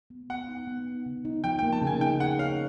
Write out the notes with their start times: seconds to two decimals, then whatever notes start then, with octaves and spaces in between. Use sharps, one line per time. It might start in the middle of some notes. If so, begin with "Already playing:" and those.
0.10 B3
0.30 B3 F#5
0.49 D#4
0.67 B3
0.87 D#4
1.06 C#3
1.25 D#4
1.44 F3 G5
1.59 G5
1.63 A#3
1.73 A5
1.82 C#3
1.87 G#5
2.01 D#4 G5
2.20 G#4 F#5
2.39 C#5 F5